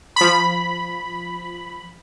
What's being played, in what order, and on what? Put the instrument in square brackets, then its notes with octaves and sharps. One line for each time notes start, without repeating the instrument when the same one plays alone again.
[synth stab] F3 B5